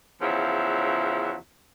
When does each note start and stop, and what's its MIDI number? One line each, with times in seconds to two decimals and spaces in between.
0.21 1.35 40
0.21 1.35 49
0.21 1.35 53
0.21 1.35 54
0.21 1.35 76